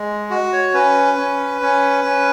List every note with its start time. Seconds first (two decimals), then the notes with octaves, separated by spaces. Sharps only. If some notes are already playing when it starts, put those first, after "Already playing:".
Already playing: G#3
0.30 F#4
0.53 C#5
0.74 C#4 B4
1.18 C#4
1.61 C#4
2.05 C#4